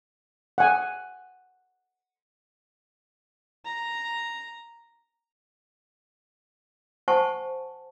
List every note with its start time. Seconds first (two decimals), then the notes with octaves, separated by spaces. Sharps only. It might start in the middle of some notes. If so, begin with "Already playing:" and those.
0.58 F#5 G#5
3.65 A#5
7.08 C5 F#5 G#5 A5 C#6